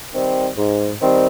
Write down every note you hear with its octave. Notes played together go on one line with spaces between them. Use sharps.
D#3 G3 C4
G#2
D#3 G3 C4